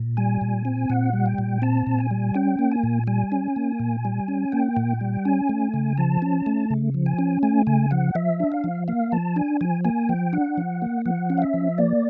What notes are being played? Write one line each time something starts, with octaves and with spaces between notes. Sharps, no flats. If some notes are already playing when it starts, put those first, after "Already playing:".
Already playing: A#2
G3 G#5
A#2
C4
A#2 F#5
G3
G5
A#2
C4 A5
A#2
G#5
G3
C#4 G5
A#3
G#5
A#2
G3 G#5
C#4
A#3
A#2
G3
C#4
A#3 G5
A#2
G3
C#4 G#5
A3
C#3
F3 A5
C#4
A3
C#3
F3
G#5
C#4
A3 G#5
C#3 G#5
F3 F#5
F3 E5
D4
F5
F3
A#3 F5
F3 A5
D4 G#5
F3 G#5
A#3 G#5
F3 G5
D4 F#5
F3
A#3
F3 F#5
C#4
F5
E5
F3
A#3 D5